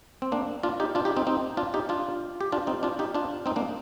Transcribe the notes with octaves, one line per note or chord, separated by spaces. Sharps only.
C4
A#3 D4
D4 F4
D#4 G4
D4 F4
D#4 G4
C4 D#4
C4 D#4
D4 F4
D#4 G4
D4 F4
G4
D4 F4
C4 D#4
D4 F4
D#4 G4
D4 F4
C4 D#4
A#3 D4